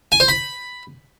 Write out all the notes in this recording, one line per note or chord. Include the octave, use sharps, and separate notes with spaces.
G#5
C5
B5